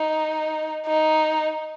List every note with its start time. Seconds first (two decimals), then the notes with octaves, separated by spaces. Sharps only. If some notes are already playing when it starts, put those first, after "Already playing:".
Already playing: D#4
0.86 D#4